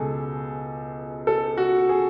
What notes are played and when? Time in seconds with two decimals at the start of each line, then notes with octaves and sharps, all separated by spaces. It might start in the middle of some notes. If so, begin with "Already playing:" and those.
Already playing: C#2 B2 G#4 A4
1.27 A4
1.57 F#4
1.89 G#4